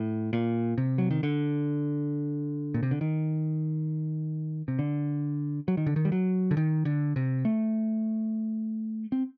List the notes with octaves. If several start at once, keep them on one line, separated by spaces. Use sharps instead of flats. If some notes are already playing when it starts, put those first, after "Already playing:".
Already playing: A2
A#2
C3
F#3
D#3
D3
A#2
C3
D3
D#3
C3
D3
F#3
D#3
D3
D#3
G3
F#3
D3
D#3
D3
C3
A3
C4